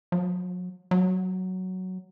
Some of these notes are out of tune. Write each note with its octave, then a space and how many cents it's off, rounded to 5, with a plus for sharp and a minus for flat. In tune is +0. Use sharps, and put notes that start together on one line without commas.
F#3 -40
F#3 +5